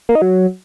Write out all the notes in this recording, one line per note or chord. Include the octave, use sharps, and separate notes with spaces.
A#3
D#4
F#3